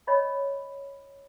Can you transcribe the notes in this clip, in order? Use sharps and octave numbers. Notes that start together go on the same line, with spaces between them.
C#5 D#5 B5 C#6